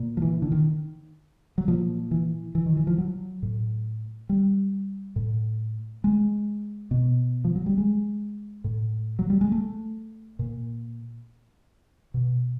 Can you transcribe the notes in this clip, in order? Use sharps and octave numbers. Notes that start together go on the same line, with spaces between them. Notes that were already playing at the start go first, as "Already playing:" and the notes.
Already playing: A#2
F3
E3
D3
D#3
F#3
A#2 F3
E3
E3
D#3
E3
F3
F#3
A2
G3
A2
G#3
B2
F3
F#3
G3
G#3
A2
F#3
G3
G#3
A3
A#2
B2